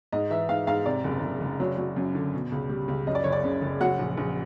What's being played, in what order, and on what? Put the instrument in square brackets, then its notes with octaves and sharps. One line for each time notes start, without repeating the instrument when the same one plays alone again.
[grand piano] G#2 D#5
E3 E5
G#2 F5
G#2 F5
C3 D5
F#1
F#1
F#1
F#3
F#3
F#2
D3
B2
C#2
G3
C#2
F#2 D#5
D5
F#1 C#5
D5
C#3
F#1
F#3 F#5
A#1
A#1